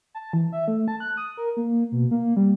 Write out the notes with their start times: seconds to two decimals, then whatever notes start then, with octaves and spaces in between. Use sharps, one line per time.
0.15 A5
0.33 E3
0.52 E5
0.68 A3
0.88 A5
1.00 F#6
1.17 D#6
1.37 A#4
1.57 A#3
1.92 B2
2.11 A#3
2.37 G3